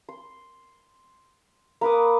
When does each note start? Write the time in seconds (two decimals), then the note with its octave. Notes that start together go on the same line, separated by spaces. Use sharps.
0.09 C6
1.81 A#3 B4 D6 D#6